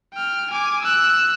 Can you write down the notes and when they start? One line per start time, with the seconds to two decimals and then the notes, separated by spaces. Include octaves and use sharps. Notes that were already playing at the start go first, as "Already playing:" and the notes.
0.13 G5 F6
0.50 G#5 D6
0.82 E6 F#6